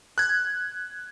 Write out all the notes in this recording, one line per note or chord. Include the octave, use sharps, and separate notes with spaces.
F#6 G#6